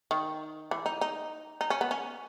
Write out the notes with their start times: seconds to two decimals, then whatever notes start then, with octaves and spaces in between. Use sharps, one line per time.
0.11 D#3
0.71 E3
0.86 D#4
1.01 D#4
1.61 D#4
1.70 C#4
1.81 B3
1.91 C#4